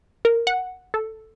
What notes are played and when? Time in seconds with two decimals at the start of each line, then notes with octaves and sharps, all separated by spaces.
0.25 A#4
0.47 F#5
0.94 A4